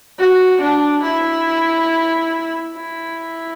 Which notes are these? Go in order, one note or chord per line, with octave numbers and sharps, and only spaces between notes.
F#4
D4
E4
E4